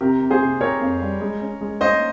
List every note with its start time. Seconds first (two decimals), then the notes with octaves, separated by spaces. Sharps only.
0.01 C3 G4 A#4
0.21 C3
0.31 G#4 C5
0.41 C3
0.61 C4 A#4 C#5
0.81 F2
1.01 G3
1.21 G#3
1.41 C#4
1.61 G#3
1.81 C#4 C5 D#5